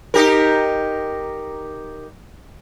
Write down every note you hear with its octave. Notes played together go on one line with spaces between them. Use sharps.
D#4 G4 A#4